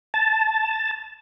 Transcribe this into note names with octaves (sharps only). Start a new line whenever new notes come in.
A5